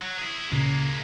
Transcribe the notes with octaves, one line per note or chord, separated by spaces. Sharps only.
F#3
E4 G#4
C#2 A#2 C#3 G#3 A#3